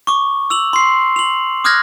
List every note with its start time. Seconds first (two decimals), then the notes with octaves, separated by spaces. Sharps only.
0.07 C#6 D6
0.50 E6 F7 F#7
0.73 C6 C7
1.16 F7 F#7
1.64 D6 D#6 F6 F#6 G#6 A#6